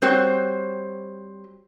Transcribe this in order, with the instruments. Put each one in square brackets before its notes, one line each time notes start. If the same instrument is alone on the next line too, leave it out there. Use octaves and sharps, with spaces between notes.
[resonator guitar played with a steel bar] G3 C4 F#4 C5 C#5 G5